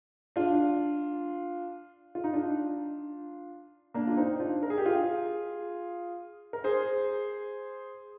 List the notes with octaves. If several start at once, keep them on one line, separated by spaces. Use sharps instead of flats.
D4 F4
F4
D#4
D4 F4
A#3 D4
F4
C4 D#4
D4 F4
A#4
G#4
G4
F4 G#4
A#4
G#4 C5